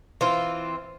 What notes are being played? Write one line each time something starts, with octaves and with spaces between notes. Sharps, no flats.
E3 C4 F4